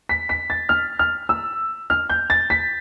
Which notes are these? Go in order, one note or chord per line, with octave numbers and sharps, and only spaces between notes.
B6
B6
A6
F6
F6
E6
F6
G6
A6
B6